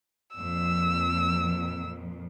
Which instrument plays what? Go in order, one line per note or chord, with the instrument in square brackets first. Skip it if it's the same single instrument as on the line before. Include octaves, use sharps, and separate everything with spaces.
[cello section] F2 A#2 F3 [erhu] E6